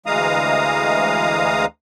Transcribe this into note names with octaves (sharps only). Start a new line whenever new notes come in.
D2 E3 G#3 F5 A#5 D#6